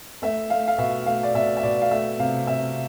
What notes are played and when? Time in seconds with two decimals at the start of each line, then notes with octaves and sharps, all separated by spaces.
0.22 A3 E5
0.50 A3 F5
0.68 F5
0.78 B2 E5
1.06 A3 F5
1.23 D5
1.34 B2 E5
1.57 E5
1.63 B2 D5
1.82 F5
1.91 A3 E5
2.19 C3 F5
2.47 C3 E5